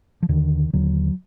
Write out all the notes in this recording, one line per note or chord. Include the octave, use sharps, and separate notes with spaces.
F3
D#2 D3 D#3
D#2 D3 F#3